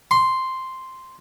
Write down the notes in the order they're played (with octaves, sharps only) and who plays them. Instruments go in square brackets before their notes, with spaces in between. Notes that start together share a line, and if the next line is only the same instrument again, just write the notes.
[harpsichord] C6